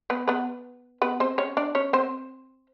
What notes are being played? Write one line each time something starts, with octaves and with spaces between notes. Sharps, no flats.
B3 B4
B3 B4
B3 B4
C4 C5
C#4 C#5
D4 D5
C#4 C#5
C4 C5